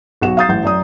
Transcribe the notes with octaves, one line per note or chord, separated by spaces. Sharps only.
B1 F#4 E7
F5 A#5 D#6 G6 A6 C7
A1 F#5 G6
F#2 D5 A#5 D#6